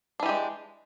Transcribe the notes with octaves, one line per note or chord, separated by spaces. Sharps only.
E3 G#3 D4 G4